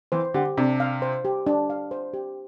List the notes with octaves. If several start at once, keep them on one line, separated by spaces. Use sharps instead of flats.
E3 C5
D3 G4
C3 D4
F5
C5
G4
D4
F5
C5
G4